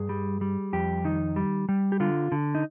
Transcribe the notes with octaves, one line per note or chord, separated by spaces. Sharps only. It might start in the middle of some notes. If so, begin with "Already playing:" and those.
Already playing: G2 G#4
G3
G3
F2 G4
D#3 D#4
G3
G3
G4
D3 F4
D3
D#4